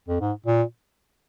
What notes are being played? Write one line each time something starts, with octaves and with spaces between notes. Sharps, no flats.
F2
G#2
A#2